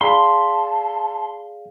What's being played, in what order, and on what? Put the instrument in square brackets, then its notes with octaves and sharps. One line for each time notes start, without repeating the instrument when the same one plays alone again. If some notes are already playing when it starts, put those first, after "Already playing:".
[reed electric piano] G#4 D5 F5 [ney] A5 [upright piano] B5 [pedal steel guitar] C6